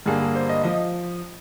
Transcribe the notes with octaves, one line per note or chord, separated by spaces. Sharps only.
G2 D3 G3 A#3 G#4
G#4
C5
D#5
F3 D#5